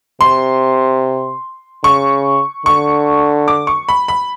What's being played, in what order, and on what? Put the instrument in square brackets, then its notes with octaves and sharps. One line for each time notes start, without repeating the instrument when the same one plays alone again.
[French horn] C3 [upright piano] C6
[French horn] C#3 [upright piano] C#6
[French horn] D3 [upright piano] C#6
[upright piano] D6
C#6
B5
B5